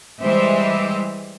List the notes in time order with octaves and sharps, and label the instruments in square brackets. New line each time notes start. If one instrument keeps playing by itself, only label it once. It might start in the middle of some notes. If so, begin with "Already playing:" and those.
[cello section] E3 G3 G#3 G4 C5 E5